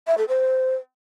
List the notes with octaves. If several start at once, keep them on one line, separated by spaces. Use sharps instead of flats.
E5
A4
C5